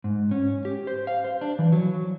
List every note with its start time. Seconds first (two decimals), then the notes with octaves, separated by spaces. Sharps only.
0.04 G#2
0.31 C#4
0.65 G4
0.87 C5
1.07 F5
1.24 C5
1.41 D4
1.59 E3
1.72 F#3